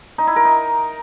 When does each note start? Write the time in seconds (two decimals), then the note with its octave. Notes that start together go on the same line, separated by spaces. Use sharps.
0.18 D#4
0.27 E4
0.36 A#4
0.45 D#4